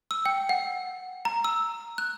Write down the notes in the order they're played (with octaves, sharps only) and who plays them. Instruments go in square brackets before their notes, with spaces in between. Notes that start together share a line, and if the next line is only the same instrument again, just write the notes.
[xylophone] E6
G5
F#5
A#5
E6
F#6